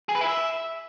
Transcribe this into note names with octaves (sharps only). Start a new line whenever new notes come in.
G#4
B4
E4
E5